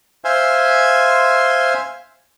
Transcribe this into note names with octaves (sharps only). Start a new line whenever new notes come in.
C5 E5 F5 G#5 C6